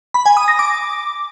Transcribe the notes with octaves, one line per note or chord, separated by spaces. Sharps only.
B5
G#5
D#6
A#6
D6